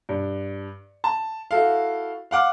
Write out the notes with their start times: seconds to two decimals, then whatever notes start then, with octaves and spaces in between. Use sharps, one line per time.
0.09 G2
1.04 A5
1.51 E4 F#4 A4 F5
2.31 F5 F#5 D6 F6